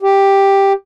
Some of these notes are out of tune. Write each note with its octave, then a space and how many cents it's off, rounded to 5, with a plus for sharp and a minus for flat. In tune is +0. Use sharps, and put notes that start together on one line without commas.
G4 +5